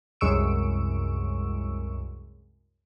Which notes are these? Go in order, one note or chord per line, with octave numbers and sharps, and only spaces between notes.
C2 F#2 G#3 C#6 E6 D7